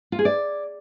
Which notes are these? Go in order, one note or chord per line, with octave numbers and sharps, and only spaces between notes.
F4
G#4
D5